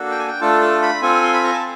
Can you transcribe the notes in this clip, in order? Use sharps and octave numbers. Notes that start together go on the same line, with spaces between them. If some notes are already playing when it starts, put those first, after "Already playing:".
Already playing: A#3 D4 F#4 A4
G5
G#5
G5
A3 D4 F4 A4 A5
A5
B5
C4 F4 A4 G#5
C6
B5
A#5
A5